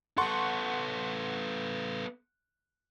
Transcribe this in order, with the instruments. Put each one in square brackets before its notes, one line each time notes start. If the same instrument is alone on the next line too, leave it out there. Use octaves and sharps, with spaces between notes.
[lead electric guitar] B3 A4 [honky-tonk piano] F#5 C6 C#6